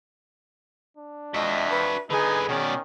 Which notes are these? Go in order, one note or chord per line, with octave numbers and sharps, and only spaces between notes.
D4
F2 F#4 D#5 E5
B4
D3 D#4 G#4 B4 G#5
B2 D#3 C#4 D5